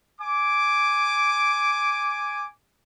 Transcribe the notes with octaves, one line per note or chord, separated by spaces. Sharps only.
G#5 D6